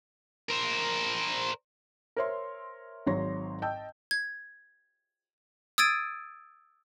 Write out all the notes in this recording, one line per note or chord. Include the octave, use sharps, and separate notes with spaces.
A#4 C5
A#4 C5 C#5 E5 C6
G#1 G#2 F#3 C#5 C6 A#6
D#5 G5 A5 E6 G6
G#6
D#6 E6 G#6 A6 D7 D#7